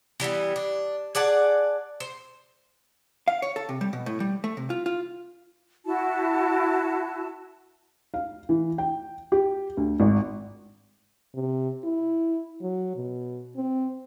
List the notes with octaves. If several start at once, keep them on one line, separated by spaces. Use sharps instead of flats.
E3 G3 A#3 B3
D4
G#4 D5 F#5 A5
C5
F5
C#5
A4
C3
G3
B2
A2
G3
A3
C3
F4
F4
E4 F#4 A5
F5
E3
G5
G4
D2
G#1
C3
E4
F#3
B2
C4